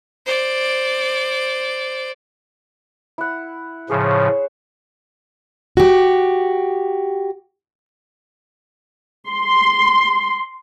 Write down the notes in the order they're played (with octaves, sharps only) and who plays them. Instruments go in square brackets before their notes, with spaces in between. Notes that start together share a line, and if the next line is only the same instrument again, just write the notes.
[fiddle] C5 D5
[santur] E4 F#5
[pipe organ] A2 C#3 F3 [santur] G#4 C5 C#5
[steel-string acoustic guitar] F#4 G4
[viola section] C6